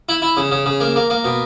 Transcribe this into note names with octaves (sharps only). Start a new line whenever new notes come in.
E4
E4
C#3
C#3
C#3
A#3
A#3
A#3
B2